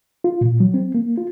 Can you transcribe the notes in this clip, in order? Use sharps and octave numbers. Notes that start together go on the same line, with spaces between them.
F4
A#2
F#3
C4
A#3
F4